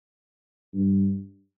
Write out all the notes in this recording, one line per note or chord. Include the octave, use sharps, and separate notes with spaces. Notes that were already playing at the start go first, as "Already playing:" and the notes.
G2